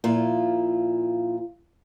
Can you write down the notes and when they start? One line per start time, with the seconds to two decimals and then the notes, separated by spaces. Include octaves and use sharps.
0.04 A#2 F3 E4 F4